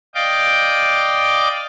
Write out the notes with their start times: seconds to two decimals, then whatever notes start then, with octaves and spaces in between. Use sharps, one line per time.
0.15 D5 D#5 F5 G5 D6